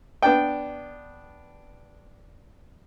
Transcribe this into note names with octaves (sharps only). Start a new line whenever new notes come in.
B3 D4 D5 G5